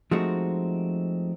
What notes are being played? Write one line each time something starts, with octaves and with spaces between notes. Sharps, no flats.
F3 G#3 A3 C4 D#4 F#4